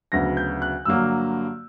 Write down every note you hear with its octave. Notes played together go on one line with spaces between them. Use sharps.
D2 C#3 F#3 B3 A#6
G6
F#6
G2 D3 F#3 A#3 E6